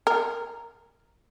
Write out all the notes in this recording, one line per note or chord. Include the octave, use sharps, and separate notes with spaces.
A#4